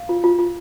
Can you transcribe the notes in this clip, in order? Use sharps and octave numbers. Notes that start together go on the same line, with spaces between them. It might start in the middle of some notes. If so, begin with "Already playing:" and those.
Already playing: F5
F4
F4
F4